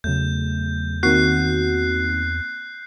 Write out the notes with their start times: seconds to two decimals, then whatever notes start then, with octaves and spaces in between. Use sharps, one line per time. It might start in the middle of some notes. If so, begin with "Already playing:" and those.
0.04 E2 C#3 F#3 A3 G6
1.03 D#3 A#3 C4 D#4 F#4 F#6 C7